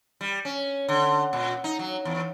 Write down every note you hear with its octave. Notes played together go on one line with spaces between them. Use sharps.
G3
C#4
D3
A#2
D#4
F#3
E2